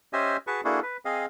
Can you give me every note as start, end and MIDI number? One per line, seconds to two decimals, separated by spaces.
0.13 0.37 61
0.13 0.37 67
0.13 0.37 72
0.13 0.37 75
0.13 0.37 76
0.13 0.37 80
0.47 0.61 66
0.47 0.61 68
0.47 0.61 71
0.47 0.61 81
0.47 0.61 85
0.65 0.80 58
0.65 0.80 62
0.65 0.80 64
0.65 0.80 66
0.65 0.80 68
0.65 0.80 69
0.82 0.97 71
1.05 1.26 60
1.05 1.26 68
1.05 1.26 75
1.05 1.26 77